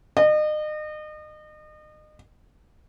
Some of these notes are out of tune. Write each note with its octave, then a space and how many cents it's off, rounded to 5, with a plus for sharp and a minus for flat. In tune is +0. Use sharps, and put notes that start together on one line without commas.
D#5 -35